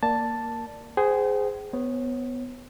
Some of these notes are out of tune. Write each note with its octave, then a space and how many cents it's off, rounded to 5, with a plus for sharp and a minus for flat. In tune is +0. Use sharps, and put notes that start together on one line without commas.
A#3 +0 D5 +0 A5 +5
G#4 +0 C5 -20 G5 -40
B3 +10 C#5 -25